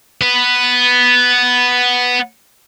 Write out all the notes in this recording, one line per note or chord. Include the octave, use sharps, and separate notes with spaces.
B3 B4